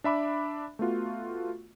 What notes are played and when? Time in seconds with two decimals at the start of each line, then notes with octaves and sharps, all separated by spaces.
0.04 D4 E5 B5 D6
0.79 A3 B3 F4 F#4